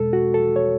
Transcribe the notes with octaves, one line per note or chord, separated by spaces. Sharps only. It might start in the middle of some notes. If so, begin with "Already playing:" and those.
Already playing: E2 B2 G#3 A4
F#4
A4
C#5